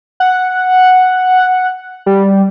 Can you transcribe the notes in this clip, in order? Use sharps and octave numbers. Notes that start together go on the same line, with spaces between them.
F#5
G3